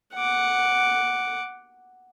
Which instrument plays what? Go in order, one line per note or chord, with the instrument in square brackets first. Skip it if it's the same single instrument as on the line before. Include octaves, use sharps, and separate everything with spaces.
[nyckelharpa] F#5 D6